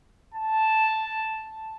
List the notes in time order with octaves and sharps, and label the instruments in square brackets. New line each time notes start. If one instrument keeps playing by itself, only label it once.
[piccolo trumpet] A5